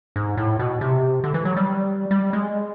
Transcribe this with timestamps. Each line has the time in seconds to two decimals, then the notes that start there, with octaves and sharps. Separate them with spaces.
0.16 G#2
0.37 A2
0.59 B2
0.81 C3
1.24 D3
1.34 E3
1.45 F#3
1.56 G3
2.11 G3
2.33 G#3